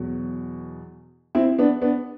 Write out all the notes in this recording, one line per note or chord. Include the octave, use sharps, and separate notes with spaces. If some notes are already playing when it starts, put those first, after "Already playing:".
Already playing: E2 B2 F#3
C4 E4
B3 D4
B3 D4